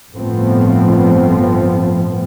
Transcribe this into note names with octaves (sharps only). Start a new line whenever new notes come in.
G1 A2 F3 A3 B3 C4